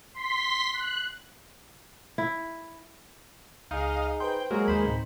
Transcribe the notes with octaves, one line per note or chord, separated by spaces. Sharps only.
C6 B6
F#6
E4
C#2 D#4 G#4 D#5 F5
B4 C5 G5 C6
F#3 G#3 A#3 F#4 A#4
D#2 D#4 C5 B5
D2 A2 C3